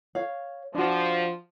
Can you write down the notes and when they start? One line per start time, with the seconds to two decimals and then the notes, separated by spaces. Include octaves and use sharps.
0.15 C#5 F5
0.75 F3 D4 F#4